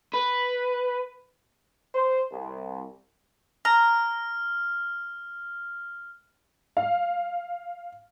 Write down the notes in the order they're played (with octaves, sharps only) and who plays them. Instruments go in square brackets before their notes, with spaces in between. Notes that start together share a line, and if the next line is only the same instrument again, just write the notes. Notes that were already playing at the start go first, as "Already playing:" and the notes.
[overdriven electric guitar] B4
[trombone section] C5
C2
[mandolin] A#5 [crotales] F6
[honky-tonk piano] F5